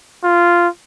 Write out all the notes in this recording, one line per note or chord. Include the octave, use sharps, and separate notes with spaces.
F4